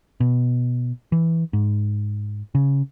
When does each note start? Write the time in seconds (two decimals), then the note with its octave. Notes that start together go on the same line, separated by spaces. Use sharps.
0.20 B2
1.12 E3
1.53 G#2
2.55 C#3